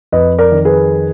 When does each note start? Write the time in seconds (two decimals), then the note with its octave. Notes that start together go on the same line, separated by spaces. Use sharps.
0.12 F2 B4 D#5
0.38 A#4 D5
0.52 D#3
0.65 G#4 B4